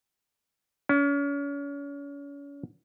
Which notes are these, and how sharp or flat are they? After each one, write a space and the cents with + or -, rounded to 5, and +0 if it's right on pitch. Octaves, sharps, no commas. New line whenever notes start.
C#4 +35